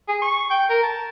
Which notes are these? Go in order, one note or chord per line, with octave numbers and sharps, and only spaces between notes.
G#4
C#6
G5
A#4
A5